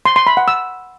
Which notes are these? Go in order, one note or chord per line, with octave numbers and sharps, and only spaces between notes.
C6
C6
B5
F#5
E6